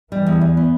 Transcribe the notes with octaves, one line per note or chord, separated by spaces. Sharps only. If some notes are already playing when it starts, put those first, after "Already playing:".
E3 G3
E2
E2
B3